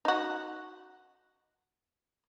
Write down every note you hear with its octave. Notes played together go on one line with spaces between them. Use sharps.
D#4 F#4